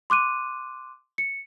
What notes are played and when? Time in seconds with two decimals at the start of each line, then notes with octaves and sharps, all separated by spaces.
0.10 C6 D6 F#6 D#7
1.18 C#7